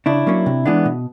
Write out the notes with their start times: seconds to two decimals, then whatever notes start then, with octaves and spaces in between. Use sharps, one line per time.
0.06 C#3 D4 E4
0.26 F#3 A#3 C#4
0.46 C3
0.66 E3 G#3 B3 D4
0.85 B2